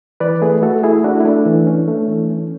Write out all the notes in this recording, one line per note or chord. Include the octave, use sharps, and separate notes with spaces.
E3 B4 D5
A3 G#4 B4
A3 F#4 A4
A3 E4 G#4
A3 D4 F#4
E4
A3 D4
E3
C#4
A3
E3
C#4